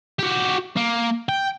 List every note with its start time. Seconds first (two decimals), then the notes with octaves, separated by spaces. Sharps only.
0.19 F#4 G4
0.77 A#3
1.29 G5